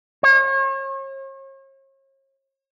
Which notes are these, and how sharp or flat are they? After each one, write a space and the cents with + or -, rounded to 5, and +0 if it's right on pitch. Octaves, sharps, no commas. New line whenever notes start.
C#5 -40